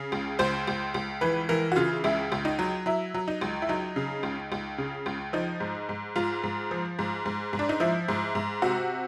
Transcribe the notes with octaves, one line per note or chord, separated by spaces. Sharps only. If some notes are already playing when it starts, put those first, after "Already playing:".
Already playing: C#3
C#2
C#2 C5
C#2
C#2
E3 B4
E3 A#4
F#4
C#3 F4
C#2 E4
C#2
D#4
F#3
F#3 E4
F#3
D#4
C#2
E4
F#3 D#4
C#3
C#2
C#2
C#3
C#2
F3 D#4
G#2
G#2
G#2 F4
G#2
F3
G#2
G#2
G#2
D4
D#4
F3 E4
G#2
G#2
C3 F#4